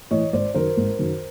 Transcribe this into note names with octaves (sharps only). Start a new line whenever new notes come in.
A2 E3 C#5 D#5
G#1 C5 D5
F#2 D#3 A#4 C5
G#1
F#2 D#3